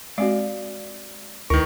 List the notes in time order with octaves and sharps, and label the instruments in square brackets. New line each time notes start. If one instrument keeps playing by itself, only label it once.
[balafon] G#3 C4 F#4 [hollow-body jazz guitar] D5 F5
[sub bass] D2 [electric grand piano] D#3 C#6 [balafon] E4 B4 [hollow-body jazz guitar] A#4